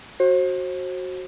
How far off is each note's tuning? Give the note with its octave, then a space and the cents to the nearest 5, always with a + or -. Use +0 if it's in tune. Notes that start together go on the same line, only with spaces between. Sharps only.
F#4 +0 C5 +35